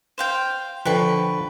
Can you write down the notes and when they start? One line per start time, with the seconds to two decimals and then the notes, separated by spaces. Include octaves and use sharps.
0.18 C5 F5 G5
0.85 D3 F3 B4 G5 C#6